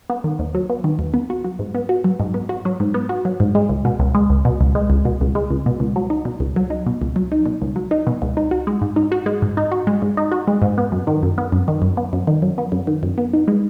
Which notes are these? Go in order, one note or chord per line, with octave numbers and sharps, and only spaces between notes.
B3
D#3
D#2
F#3
B3
D#3
D#2
B3
F#4
F#3
G#2
B3
F#4
F#3
G#2
B3
F#4
F#3
G#2
B3
F#4
F#3
G#2
G#3
C#2
B2
C#2
G#3
C#2
B2
C#2
G#3
C#2
B2
C#2
G#3
C#2
B2
C#2
F#3
D#4
B2
C#2
F#3
D#4
B2
C#2
F#3
D#4
B2
C#2
F#3
D#4
B2
C#2
D#4
F#4
G#3
G#2
D#4
F#4
G#3
G#2
D#4
F#4
G#3
G#2
D#4
F#4
G#3
G#2
B3
F#2
D#3
F#2
B3
F#2
D#3
F#2
B3
F#2
D#3
F#2
B3
F#2
D#3
F#2
B3
D#4
G#3